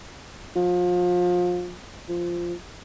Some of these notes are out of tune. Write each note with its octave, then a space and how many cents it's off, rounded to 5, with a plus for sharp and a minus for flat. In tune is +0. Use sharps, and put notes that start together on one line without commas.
F3 +30
F3 -10